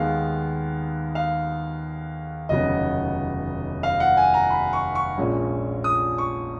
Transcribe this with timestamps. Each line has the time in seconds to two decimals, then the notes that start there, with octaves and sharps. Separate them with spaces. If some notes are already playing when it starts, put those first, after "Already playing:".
Already playing: D#2 D#3 G#3 B3 F5
1.15 F5
2.49 F1 D#2 C#3 F#3 B3 D#5
3.83 F5
4.00 F#5
4.17 G#5
4.34 A#5
4.50 B5
4.73 C#6
4.95 C#6
5.18 A#1 A#2 G#3 C#4
5.84 D#6
6.18 C#6